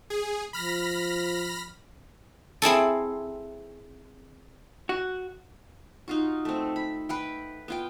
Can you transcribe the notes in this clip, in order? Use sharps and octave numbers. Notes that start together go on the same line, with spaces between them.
G#4
F3 B5 F6 A#6
C4 E4 G#4 A4
F#4
D#4 F4 F#4
A3 C4
B5
B4 F#5 G5
B3 F4 G5